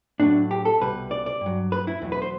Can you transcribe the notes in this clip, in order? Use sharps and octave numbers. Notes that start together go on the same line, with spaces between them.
A2 F#3 D4
G4
A4
C2 B2 G3 B4
D5
D5
G2
F#3
B4
E4
E2 B2 F#3
B4
C5